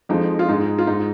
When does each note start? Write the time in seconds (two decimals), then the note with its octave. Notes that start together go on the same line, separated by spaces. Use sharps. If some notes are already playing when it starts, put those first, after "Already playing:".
0.09 F2 F3 G#3 D#4
0.39 F4
0.48 G#2 G#3 D#4
0.78 F4
0.87 G#2 G#3 D#4